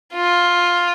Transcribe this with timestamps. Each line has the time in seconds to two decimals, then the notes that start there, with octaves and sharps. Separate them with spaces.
0.14 F4